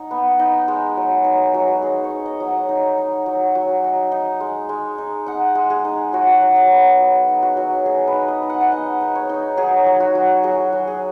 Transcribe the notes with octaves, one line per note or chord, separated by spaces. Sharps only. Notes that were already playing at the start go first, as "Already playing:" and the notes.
Already playing: D#4 F#5
B3
D#4
G#3
F#3
D#4
F#3
D#4 G#4
C#5
D#4
D#5
F#3
F#5
D#4
D#4
F#3
F#3 G#5
D#4
D#4
G#3
G#3
D#4
D#4 F#5
G#3
G#4
D#4
F#3 F#4
F#3
G#4
B3
F#3
D#4
F#4
F#3
D#4 G#4
B4
D#4
D#5
D#4
F#5
F#5
D#4 D#5
D#4
C#5
D#4
F#3 G#4
F#3
F#4
F#3
F#3 G#4
F#3
G#4